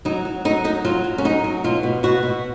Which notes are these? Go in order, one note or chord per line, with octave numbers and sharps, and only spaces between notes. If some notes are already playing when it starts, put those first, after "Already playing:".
F#3 D#4
F#3
F#3 D#4
F#3 D#4
F#3 F4
F#3
C#4
F#3 D#4
F#3
B2 F4
B2
B2 F#4
B2